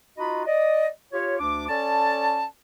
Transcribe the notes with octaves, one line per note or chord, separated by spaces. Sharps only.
D#4 F4 F#4 D#5 B5
D5 D#5
F4 G4 C#5
D2 D4 D6
C#4 A4 D5 A5